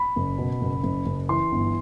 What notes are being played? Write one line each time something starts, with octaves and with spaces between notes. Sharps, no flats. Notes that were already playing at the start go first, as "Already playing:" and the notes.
Already playing: B5
F#1
B2
F#1
F#1
F#1
E3 C6
G1